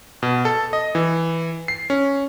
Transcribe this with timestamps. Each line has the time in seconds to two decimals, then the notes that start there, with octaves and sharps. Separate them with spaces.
0.23 B2
0.45 A4
0.73 D#5
0.95 E3
1.68 C7
1.90 C#4